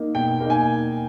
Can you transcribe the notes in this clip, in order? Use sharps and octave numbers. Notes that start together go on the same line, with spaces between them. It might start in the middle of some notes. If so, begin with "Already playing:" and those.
Already playing: A#3 D#4
B2 G5
A#3 D#4
G#5